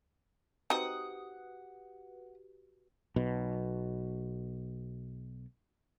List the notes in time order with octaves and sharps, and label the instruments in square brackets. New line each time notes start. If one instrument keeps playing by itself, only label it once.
[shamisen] C4 D#4 [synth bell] F#4 G4 B4 [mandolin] F#5 D#6
[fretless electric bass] B1 B2